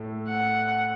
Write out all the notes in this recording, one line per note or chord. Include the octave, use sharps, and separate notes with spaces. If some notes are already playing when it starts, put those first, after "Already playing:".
Already playing: A2 A3
F#5